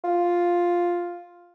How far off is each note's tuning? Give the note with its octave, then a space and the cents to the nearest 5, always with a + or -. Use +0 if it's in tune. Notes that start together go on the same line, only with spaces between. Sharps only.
F4 +5